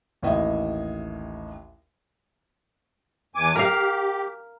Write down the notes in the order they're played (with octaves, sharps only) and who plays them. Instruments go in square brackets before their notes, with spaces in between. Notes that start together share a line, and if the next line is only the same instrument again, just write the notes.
[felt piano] A1 D#2 E3 E4 D#5 E5
[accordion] E2 G#5 D6
[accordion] G4 [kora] A#4 F5